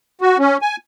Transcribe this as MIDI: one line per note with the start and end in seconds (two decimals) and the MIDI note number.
0.21 0.38 66
0.39 0.57 61
0.62 0.76 80